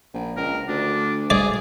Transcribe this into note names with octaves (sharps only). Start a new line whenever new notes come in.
A#1
C#2 A#4
D2 D4
G#4 D5